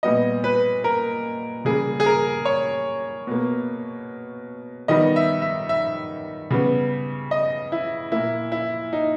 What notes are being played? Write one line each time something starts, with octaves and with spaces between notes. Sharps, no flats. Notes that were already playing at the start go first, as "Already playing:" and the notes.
A#2 G3 B3 D#5
B4
A#4
C#3 G3 A#3 G#4
G#4
A#4
C#5
B2 A#3
D#3 G3 B3 D#5
E5
E5
E5
C#3 G3 B3
D#5
E4
A#2 A#3 E4
E4
D#4